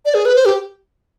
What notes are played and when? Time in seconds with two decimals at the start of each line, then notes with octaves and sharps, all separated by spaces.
0.05 D5
0.14 G#4
0.25 B4
0.36 C5
0.46 G4